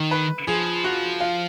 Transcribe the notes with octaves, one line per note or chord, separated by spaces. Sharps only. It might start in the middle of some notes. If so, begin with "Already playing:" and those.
Already playing: D#3
B4
F3 G#4
F#4
F4